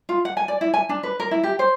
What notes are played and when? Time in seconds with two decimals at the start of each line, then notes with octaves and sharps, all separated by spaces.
0.09 F4
0.25 F#5
0.37 G#5
0.48 D5
0.61 E4
0.74 G#5
0.89 D4
1.03 B4
1.20 A#4
1.31 E4
1.44 G4
1.59 C5